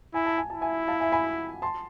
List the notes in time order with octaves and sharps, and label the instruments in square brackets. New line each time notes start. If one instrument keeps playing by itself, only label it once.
[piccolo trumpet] E4 [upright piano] G#5
[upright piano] A5
G#5
[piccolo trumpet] E4 [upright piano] A5
[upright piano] E5 G#5
F5 A5
E5 G#5
G#5 B5
A5 C6